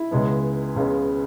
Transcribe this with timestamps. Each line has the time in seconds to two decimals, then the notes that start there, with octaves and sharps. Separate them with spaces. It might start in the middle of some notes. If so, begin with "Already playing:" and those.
Already playing: E4
0.11 C#2 C#3 G#3 B3
0.76 C#2 C#3 G#3 B3